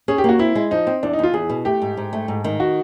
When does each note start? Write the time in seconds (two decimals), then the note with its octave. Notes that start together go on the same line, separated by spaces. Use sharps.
0.08 C#4 G#4
0.18 G4
0.24 A#3 F#4
0.39 C4 E4
0.55 G#3
0.71 F3 D#4
0.87 C4
1.03 E2 D4
1.13 D#4
1.19 E2 F4
1.34 E2 G#4
1.50 B2
1.65 A3 G4
1.82 G#2
1.97 G#2
2.13 A3
2.28 G#2
2.44 D#3
2.60 F#4